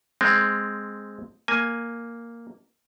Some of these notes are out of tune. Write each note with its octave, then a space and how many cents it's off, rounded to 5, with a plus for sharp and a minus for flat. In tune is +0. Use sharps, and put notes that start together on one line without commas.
G#3 +0 C4 +0
A#3 +0 G#5 +0